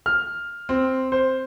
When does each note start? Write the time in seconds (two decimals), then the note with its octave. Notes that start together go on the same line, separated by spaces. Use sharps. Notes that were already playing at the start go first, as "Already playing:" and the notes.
0.06 F6
0.69 C4
1.12 C5